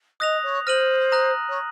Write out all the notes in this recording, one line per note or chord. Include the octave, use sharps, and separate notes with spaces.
D#5 D#6 F#6 A#6 F7
C#5
C5 F6 A#6 D#7 F#7
A#5 D#6 F#6 A#6
C#5